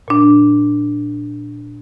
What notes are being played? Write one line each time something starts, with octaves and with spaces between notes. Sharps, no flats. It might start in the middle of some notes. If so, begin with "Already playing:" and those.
A#2 D4